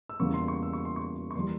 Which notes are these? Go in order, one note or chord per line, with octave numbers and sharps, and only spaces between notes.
E6
E2 C#3 E3 G3 A#3 C#6
C6
C#6
E6
C#6
C6
C#6
C#6
E3 G3 A#3 C6